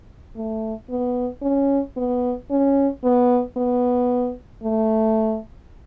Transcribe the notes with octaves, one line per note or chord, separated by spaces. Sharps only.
A3
B3
C#4
B3
C#4
B3
B3
A3